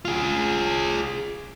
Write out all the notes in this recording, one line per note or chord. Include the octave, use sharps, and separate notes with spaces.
F4 G#4